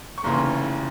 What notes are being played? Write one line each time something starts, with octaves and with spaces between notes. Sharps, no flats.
C#6
F1 D#2 C#3 E3 A#5 C6